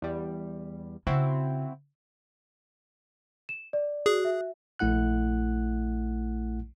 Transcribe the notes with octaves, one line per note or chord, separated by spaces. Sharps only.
E2 G3
C#3 C4 E4 F#4
E7
D5
F#4 G#4
E5
A#1 A3 E4 F#5 F#6